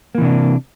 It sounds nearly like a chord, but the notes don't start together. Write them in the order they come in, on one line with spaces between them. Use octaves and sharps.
A#3 E3 C3 D4